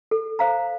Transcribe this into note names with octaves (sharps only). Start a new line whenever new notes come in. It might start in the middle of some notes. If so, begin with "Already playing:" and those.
A4
C5 F5 A#5